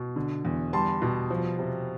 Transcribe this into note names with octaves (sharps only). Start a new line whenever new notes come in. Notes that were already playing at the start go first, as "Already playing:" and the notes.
Already playing: B2
D3
E2
G3 A5 C6
B2
F3
C3